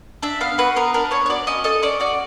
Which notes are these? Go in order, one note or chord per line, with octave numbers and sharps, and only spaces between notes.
D4 E5
B3 F5
F#4 B4
B3 A#4
D4 A#4
B3 C#5
C#5
F#4 D5
C#4 D#5
A4 D#5
C#4 D5
F#4 D5